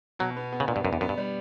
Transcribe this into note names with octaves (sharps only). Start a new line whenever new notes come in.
B2 F#3
B3
B3
C#3
A#2 D4
G2
F#2 B3
E2
F#2 B3
G2
G3